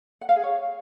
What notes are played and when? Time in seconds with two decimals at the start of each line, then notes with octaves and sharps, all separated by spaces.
0.21 F#5
0.29 F5
0.36 G#4
0.43 C#5